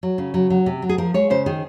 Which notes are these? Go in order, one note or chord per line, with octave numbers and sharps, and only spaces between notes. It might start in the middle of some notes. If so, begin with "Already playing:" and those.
F#3
C#3
F#3
F#3
C3
F#3
G#4
F3 A#4
G#3 C#5
C#3 C5
D#3 G#4